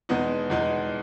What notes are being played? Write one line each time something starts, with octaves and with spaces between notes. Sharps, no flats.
E2 B2 G#3 B3 D#4
E2 B2 G#3 B3 D#4